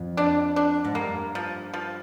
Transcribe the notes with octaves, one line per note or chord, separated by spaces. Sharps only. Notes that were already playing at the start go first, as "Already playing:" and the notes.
Already playing: F2
D4
D4
G#2
G2 A#3
F3
F3